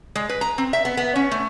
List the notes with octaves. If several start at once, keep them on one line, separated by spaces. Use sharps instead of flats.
G#3
B4
A#5
C4
E5
B3
B3
C#4
A3